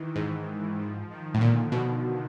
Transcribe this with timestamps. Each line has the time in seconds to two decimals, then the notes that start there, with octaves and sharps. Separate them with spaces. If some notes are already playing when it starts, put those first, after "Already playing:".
Already playing: D#3 E3
0.16 G#2 E3
0.79 F3
1.10 D#3
1.34 A2
1.41 A#2 D3
1.72 B2